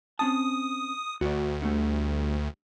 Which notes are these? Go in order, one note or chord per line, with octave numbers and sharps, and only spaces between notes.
C4 C#4 A5 D#6
D2 F#4 D5
D3 G3 A3